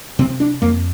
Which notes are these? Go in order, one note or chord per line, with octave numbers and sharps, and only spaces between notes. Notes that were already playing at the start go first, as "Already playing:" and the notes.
C3 C4
D4
F2 A#3